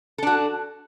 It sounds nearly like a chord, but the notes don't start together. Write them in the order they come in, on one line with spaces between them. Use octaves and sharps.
A4 D4 F#4